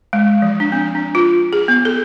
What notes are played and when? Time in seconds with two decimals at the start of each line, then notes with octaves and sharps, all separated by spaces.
0.13 G#3
0.42 F3
0.60 D4
0.72 C4
0.95 D4
1.15 F4
1.53 G#4
1.68 B3
1.85 A4